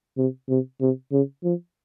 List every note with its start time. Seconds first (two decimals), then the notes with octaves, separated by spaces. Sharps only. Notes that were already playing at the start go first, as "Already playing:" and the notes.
0.17 C3
0.49 C3
0.81 C3
1.12 C#3
1.44 F3